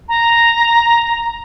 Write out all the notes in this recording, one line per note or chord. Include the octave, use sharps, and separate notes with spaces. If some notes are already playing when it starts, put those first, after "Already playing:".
A#5